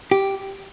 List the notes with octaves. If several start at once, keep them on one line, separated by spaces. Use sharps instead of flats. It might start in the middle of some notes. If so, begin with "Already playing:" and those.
G4